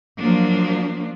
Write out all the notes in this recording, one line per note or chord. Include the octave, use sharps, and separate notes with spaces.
F3 F#3 A#3 D4